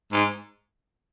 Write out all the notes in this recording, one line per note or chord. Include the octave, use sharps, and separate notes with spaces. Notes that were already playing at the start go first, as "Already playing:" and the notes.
G#2